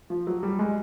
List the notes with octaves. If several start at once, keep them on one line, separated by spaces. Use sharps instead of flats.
F3
F#3
G3
G#3